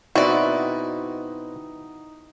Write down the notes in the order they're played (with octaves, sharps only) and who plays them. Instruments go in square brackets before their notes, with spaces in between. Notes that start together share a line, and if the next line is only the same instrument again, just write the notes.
[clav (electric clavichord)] B2 C4 B4 [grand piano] D#4 [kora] E4 [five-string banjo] F#4 D5